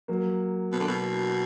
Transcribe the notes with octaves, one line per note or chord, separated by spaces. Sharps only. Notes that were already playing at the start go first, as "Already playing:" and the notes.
F#3 A#3
B2
D3
B2